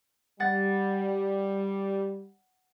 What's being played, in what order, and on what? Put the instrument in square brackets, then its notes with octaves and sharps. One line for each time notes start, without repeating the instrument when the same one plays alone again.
[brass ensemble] G3 [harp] F#5 A6